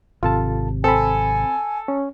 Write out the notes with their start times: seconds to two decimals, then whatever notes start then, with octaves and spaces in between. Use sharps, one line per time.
0.23 G#1 C3 F4 A4 A5
0.84 C4 A4 G#5 B5
1.88 C#4